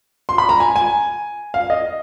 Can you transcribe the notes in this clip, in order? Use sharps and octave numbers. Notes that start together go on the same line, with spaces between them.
C6
B5
A#5
G#5
G#5
F5
D#5